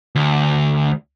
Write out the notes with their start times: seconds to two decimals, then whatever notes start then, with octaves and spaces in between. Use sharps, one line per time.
0.15 D2